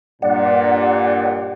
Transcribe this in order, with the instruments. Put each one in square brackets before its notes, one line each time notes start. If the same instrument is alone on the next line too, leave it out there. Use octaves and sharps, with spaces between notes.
[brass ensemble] G2 A#2 [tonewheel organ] D5 F#5